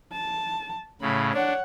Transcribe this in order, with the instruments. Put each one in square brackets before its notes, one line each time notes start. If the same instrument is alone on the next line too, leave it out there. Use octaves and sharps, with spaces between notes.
[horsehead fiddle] A5
[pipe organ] A2 C#3 [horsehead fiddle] B5
[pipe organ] D4 [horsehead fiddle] C#5 F#5